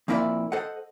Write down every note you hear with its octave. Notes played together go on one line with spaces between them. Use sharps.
F2 A#2 A#3 E4 D5 E5
A4 C5 D#5 F#5